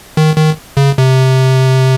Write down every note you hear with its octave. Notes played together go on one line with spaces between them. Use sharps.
D#3
D#3
C#3
C3